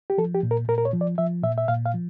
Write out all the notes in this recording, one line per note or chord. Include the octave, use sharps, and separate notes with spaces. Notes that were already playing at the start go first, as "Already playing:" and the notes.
G4
F3 A4
G4
A#2
A#4
A#2 A#4
A#4
C#5
F3
D5
F3 E5
A#2 E5
E5
A#2 F5
F5
F3